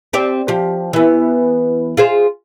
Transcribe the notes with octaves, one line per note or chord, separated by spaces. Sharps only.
C4 G4 D5
F3 G4
E3 B3
F4 G#4 C5